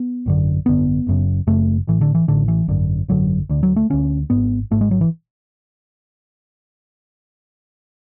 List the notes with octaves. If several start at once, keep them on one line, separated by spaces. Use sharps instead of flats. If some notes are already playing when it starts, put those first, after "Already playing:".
Already playing: B3
G#1 F#2 D3
G#1 F#2 D3 B3
F#1 F#2 C#3
F#1 F#2 C#3 A3
A1 A2 E3
D3
E3
A1 A2 D3
E3
G#1 F#2 D3
G#1 F#2 D3 F#3
D2 D3
F#3
A3
D2 D3 C#4
G#1 G#2 B3
G#1 G#2 A3
G#3
F#3
E3